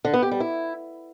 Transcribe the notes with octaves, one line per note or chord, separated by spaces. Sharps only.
D3
B3
G4
G3
E4